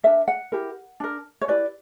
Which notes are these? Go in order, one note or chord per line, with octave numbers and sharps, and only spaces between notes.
D4 A#4 E5
F#5
E4 G4 A#4
D4 A#4
C#5
E4 G4 B4 D5